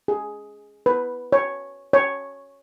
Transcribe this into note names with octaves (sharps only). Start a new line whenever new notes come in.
G#4
B4
C#5
C#5